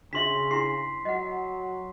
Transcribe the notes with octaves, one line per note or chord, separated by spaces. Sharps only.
C#3 D4 F#4 E5 C6 B6
D4 E4 G4 C7
F#3 D#5 F#5